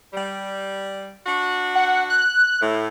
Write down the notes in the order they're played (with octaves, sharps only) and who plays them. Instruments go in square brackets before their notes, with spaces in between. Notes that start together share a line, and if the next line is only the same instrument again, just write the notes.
[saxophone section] G3
D4 F#4
[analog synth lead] F#5
F#6
[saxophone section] A2